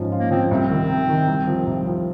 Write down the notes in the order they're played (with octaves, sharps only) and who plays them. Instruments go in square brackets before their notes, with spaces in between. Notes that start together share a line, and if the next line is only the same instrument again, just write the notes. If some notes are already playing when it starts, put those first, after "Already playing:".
Already playing: [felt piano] G#2 F3 C#4
F4
[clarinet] A#3
[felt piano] F3 [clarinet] C4
[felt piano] C2 [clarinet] C4
[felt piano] D#3
C3
D#3
C2
F3
C2
F3